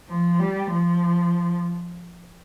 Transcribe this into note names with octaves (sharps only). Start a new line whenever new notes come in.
F3
G3
F3